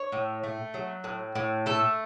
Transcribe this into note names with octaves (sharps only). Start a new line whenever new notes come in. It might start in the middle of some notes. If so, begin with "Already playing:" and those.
Already playing: C#5
A2
A3
F#3
A2
A2
A3 A4